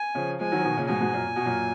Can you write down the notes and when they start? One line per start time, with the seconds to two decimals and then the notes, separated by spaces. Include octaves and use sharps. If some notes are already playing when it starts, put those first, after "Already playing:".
Already playing: G#5
0.15 C#3 F3
0.39 F3 G#3 G#5
0.52 D#3 F#3
0.58 F3
0.64 B2 D#3
0.77 A#2 C#3
0.88 G#2 B2 G#5
1.01 G#2 B2
1.13 F#2 A#2
1.25 A#2
1.36 B2
1.46 F#2 A#2